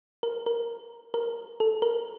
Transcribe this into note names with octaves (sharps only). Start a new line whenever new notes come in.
A#4
A#4
A#4
A4
A#4